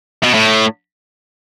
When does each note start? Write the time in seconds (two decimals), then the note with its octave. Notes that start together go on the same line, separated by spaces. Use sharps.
0.23 B2
0.34 A2